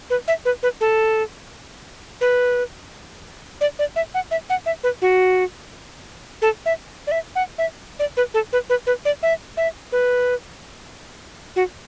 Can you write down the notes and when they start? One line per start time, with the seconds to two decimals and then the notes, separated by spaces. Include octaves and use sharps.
0.10 B4
0.28 E5
0.45 B4
0.63 B4
0.81 A4
2.21 B4
3.61 D5
3.79 D5
3.96 E5
4.14 F#5
4.31 E5
4.50 F#5
4.66 E5
4.84 B4
5.02 F#4
6.42 A4
6.66 E5
7.07 D5
7.12 E5
7.35 F#5
7.58 E5
7.99 D5
8.17 B4
8.34 A4
8.53 B4
8.70 B4
8.87 B4
9.05 D5
9.23 E5
9.57 E5
9.92 B4
11.56 F#4